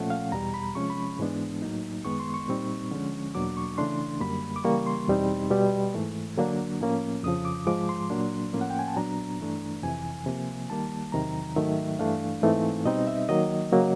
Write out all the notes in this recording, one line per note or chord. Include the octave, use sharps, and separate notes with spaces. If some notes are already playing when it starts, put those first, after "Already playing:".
Already playing: A#2 F3 A3 C#4 F#5
F5
E2 B2 G3 A#5
B5
C3 F3 G#3 C#4 C#6
B5
G#2 E3 G#3 B3 D4
A2 F#3 A#3 D#4
F#2 D#3 G#3 B3 C#6
C6
C#6
A#2 G3 C4 D#4
D3 F3 G#3 C#4
E2 B2 F#3 A#3 D4 D6
C#6
C#3 E3 A3 D4 C6
F#2 D3 G3 A#3 B5
D6
C#3 E3 G3 A#3 C#6
C6
E2 B2 G3 C4 D#4
B2 G3 B3
G#2 E3 A3
D3 F#3 A#3 D4
A2 F3 A#3 C#4
F2 C#3 F3 D#6
D6
G#2 F3 G#3 D6
C6
A#2 F#3 A#3 D4
A2 F3 A#3 C#4
F#5
G5
G#5
A5
A#2 F#3 B3 D4 A#5
G2 E3 A3 D4
F2 C3 E3 G#5
C3 F3 A#3
D#3 G3 A#3 A5
E2 C3 D#3 F#3 A#5
G#2 D#3 F#3 A3 E5
G2 E3 A3 D4 F5
G#2 E3 A3 C4 D#4
B2 G3 C4 D#4 D#5
E5
D#3 F#3 A#3 D#5
C#3 F#3 A#3